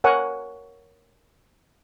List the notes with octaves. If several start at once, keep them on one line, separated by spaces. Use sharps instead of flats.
A#4 C#5 F#5 G#5